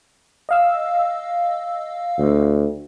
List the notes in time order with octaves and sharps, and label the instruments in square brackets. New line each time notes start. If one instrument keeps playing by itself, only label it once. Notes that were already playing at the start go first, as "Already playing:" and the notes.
[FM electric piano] D#5 F5 E6
[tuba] D2